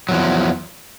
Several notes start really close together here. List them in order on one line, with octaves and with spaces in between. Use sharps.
F#3 E2 F3